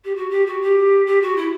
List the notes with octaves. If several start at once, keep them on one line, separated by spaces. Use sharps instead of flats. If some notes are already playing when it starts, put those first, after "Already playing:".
G4
F#4
G4
F#4
G4
G4
F#4
E4